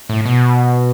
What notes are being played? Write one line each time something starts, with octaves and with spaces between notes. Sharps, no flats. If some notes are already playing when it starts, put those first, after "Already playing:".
A2
B2